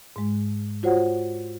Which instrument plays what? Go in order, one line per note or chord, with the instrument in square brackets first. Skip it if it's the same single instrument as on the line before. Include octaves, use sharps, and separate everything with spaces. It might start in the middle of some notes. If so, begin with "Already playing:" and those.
[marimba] G#2 G#3
F4 F#4 C5 C#5 F#5